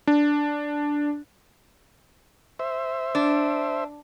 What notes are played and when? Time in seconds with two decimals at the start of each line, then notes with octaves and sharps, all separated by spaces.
0.07 D4
2.59 C5 E5
3.15 D4